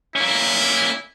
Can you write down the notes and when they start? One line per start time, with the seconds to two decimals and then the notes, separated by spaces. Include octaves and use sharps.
0.15 A#3 C#4 E4